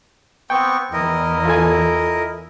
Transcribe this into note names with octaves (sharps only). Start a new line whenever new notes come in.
B3 C4 G5 C#6
E2 E4 A#4 D#5
F4 A4 G#5